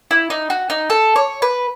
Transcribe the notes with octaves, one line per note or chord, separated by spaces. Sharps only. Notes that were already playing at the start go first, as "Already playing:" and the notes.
E4
D#4
F#4
D#4
A4
C#5
B4